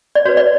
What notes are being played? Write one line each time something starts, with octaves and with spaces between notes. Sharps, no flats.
D5
F#4 B4 C#5
D5